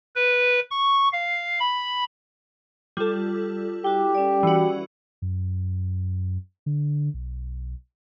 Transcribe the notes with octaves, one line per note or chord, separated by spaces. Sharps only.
B4
C#6
F5
B5
G3 F4 A4
E4 F#4 G4 D6
C#4 D5
E3 F#4
F#2
D3
B1